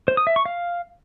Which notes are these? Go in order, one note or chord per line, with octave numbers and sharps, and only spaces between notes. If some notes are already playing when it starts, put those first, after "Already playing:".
C5
D#6
E5
C#6
F5